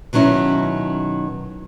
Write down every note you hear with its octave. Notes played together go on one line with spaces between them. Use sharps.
B2 D#3 F#3 C#4 E4